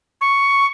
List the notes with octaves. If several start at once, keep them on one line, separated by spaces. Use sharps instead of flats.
C#6